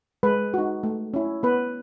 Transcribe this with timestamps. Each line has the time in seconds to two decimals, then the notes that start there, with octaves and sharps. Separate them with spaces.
0.23 G#3 B4
0.54 D#4 F#4
0.83 A3
1.14 C#4 E4
1.43 B3 B4